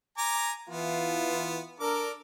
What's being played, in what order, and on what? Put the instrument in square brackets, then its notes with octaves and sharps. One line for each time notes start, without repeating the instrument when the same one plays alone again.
[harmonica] G#5 A#5 D6
[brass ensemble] E3 F4 [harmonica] B3
[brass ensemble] D4 A#4 [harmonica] A4 D6